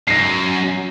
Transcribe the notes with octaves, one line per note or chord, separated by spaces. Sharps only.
F#2 A#6 C7